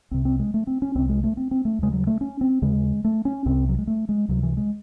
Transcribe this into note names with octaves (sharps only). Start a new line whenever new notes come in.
C2 C3 C4
C4
G#3
A3
C4
C#4
C2 C3 C4
G#3
A3
C4
C4
A3
D#2 C#3 G#3
F#3
A3
C#4
C4
D#2 C#3 G#3
A3
C#4
C2 C3 C4
F#3
G#3
A3
G#3
C#2 C3 F#3
E3
G#3